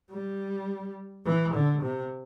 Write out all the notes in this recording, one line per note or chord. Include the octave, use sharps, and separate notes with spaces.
G3
E3
D3
C3